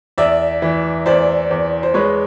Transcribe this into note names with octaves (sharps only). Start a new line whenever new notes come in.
E2 D5 E5
E3
E2 C5 D5
E2
C5
G#3 B4 C#5